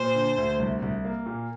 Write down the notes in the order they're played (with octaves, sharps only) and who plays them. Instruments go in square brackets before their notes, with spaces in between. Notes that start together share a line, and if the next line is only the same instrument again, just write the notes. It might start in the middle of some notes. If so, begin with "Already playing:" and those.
Already playing: [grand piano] A#2 [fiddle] C5
[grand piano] D3
D2
C2
C2
A#3
A#2